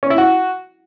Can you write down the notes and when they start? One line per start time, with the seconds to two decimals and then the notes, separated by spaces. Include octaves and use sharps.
0.03 C#4
0.10 E4
0.18 F#4